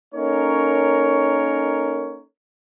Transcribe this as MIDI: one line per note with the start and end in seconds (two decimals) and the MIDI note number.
0.14 2.22 58
0.14 2.22 61
0.14 2.22 63
0.14 2.22 69
0.14 2.22 70
0.14 2.22 73